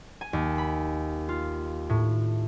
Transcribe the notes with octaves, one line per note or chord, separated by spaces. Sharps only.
G#5
D#2
B5
F4
A2